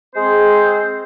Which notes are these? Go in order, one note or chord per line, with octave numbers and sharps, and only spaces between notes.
G#3 C4 G#4 C5